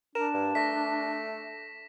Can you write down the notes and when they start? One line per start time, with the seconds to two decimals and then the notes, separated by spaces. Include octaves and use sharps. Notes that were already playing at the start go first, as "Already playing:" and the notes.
0.15 D4 A#4 E7
0.34 G2
0.55 A3 A#6 B6